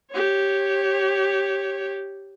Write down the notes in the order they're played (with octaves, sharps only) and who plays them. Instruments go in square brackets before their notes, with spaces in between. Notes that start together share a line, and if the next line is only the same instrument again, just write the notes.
[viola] G4 C#5